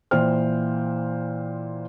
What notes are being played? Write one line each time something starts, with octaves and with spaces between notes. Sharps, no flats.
A#2 E3 C5 G5 F6